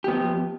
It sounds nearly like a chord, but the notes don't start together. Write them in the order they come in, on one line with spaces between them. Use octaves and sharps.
G4 B3 F3